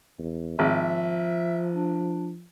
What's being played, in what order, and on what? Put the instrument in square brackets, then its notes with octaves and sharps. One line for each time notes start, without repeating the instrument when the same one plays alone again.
[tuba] E2
[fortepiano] G#1 [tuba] F3 [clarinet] E5
[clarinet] D4